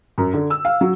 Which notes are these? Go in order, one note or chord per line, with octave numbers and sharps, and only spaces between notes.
F#2
D3
E6
F5
F#3